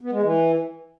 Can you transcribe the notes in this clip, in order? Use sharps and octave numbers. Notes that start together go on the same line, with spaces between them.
B3
G#3
E3